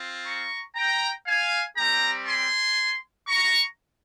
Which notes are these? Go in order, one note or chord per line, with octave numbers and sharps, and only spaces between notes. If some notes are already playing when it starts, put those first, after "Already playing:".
Already playing: C4 F4
A#5 C#6
G5 A#5
F5 G#5
G3 C4 G4 G5 A#5
G#5 C6
A#5 C#6